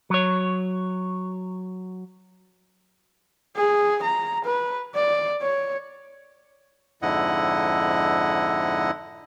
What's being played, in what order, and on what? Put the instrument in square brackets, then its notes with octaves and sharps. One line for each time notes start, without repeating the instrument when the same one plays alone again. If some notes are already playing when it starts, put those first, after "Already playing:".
[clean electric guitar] F#3 C#5
[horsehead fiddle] G#4
A#5
B4
D5
C#5
[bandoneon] F2 G#2 D3 E4 D#5 F#5